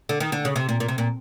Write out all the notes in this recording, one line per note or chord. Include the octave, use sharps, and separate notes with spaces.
D3
D#3
D3
C#3
C3
A#2
A#2
C3
A#2